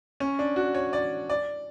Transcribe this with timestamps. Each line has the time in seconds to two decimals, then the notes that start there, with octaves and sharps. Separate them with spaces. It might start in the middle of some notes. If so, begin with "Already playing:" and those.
0.20 C#4
0.39 D4
0.56 F#4
0.75 C#5
0.93 D5
1.30 D5